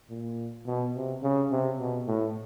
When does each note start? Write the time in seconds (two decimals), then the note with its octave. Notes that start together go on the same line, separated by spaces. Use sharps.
0.10 A#2
0.67 B2
0.95 C3
1.23 C#3
1.51 C3
1.80 B2
2.07 A2